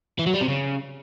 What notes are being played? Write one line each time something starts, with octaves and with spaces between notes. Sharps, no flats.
E3
F#3
G3
C3
C#3